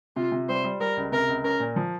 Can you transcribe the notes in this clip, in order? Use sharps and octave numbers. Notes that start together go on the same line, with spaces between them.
C3 F4
C3
G3 C5
G3
G3 A#4
C#2
C3 A#4
C#2
C#4 A#4
A#2
F3